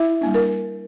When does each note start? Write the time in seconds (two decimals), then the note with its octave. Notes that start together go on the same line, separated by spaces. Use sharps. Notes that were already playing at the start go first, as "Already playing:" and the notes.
Already playing: E4 E5
0.21 G3 A#3 D4
0.34 A#4